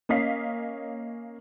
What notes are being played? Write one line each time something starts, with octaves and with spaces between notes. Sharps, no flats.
A#3 C#4 D#5 F5 B6 C7